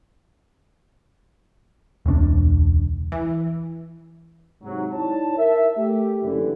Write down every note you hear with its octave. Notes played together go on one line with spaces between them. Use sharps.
E1 C#2 C4 D4
E3
G#2 C3 F#3
D#4 E4 C#5 D5 A5
A#4 E5
A3 G4
F#1 D3 E3